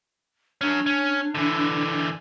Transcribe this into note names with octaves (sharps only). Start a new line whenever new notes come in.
F#3 C#4 D4
C#4 D4
D3 E3